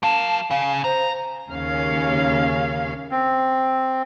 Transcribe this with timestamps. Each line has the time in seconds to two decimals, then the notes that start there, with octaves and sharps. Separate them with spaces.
0.03 F#3 F5 A5
0.51 C#3 F5
0.84 C5 A#5
1.49 D#2 C#3 C#4 F5
3.11 C4